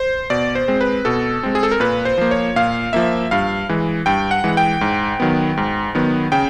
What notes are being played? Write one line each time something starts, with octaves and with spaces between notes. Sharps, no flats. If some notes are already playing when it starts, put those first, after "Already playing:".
Already playing: C5
B2 D5
C5
G#3 C4
B4
B2 A4
G#3 C4
G#4
A4
A#4
A#2 B4
C5
F3 A#3
C#5
A#2 F5
F3 A#3 E5
G2 F5
E3 G#3
G2 G5
F#5
E3 G#3
G5
G#2
D#3 F#3 B3
G#2
D#3 F#3 B3
C#3 G5